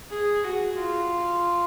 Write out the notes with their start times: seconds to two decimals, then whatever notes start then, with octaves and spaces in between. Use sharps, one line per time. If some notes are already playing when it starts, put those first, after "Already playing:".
0.11 G#4
0.44 F#4
0.78 F4